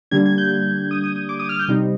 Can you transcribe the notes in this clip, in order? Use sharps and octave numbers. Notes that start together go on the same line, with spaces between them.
D3 G3 A#3 D4 G#6
G#6
G6
D#6
D#6
D#6
D6
D#6
F6
G6
C3 G3 C4 D#4